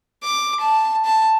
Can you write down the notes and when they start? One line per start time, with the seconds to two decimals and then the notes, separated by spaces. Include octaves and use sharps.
0.23 D6
0.60 A5
1.05 A5